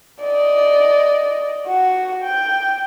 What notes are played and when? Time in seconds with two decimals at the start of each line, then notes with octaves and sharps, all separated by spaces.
0.23 D5 D#5
1.67 F#4 F#5
2.22 G5